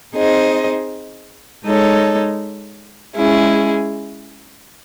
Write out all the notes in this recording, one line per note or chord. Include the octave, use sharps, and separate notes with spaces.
C4 D#4 G#4 C5 D#5
G#3 D#4 A4 C#5
G#3 C#4 E4 G#4